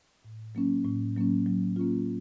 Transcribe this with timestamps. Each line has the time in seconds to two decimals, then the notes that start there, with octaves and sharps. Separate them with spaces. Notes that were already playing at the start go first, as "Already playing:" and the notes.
0.25 A2
0.55 F#3 A#3 C#4
0.85 A2
1.16 F#3 A#3 C#4
1.46 F#3
1.76 A#3 C#4 F4